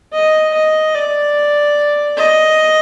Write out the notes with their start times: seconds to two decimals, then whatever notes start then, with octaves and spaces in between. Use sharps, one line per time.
0.13 D#5
0.54 D#5
0.95 D5
2.17 D#5